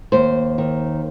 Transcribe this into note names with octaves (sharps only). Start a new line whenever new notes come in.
D#2 C5
D#3